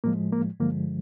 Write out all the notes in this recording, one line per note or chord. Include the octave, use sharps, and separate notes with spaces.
A2 F3 G#3 A#3
A#3
G2 D3 F3 G#3 A#3